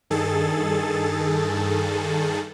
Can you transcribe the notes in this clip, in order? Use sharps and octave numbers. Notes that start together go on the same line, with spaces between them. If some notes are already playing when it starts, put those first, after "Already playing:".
G2 D#3 G#4 A4 A6